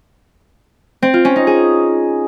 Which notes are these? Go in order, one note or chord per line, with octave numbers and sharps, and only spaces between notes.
C4
F4
C#4
D#4
G#4